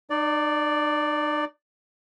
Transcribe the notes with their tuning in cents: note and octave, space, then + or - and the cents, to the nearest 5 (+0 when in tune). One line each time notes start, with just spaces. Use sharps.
D#4 -45 D5 +0